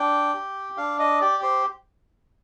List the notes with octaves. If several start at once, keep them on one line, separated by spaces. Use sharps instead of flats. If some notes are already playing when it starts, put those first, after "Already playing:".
Already playing: D4 G5
G4
D4 F5
D#5
G4 D5
C5